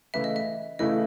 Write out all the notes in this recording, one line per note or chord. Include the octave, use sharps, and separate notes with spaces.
C#3 E3 A3 E4 B4 E5
D#5
E5
C#3 E3 A3 E4 B4 D#5